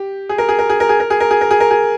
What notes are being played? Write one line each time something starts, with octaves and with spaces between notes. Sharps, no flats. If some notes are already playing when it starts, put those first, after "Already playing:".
Already playing: G4
G#4
A#4
G#4
A#4
G#4
A#4
G#4
A#4
G#4
A#4
G#4
A#4
G#4
A#4
G#4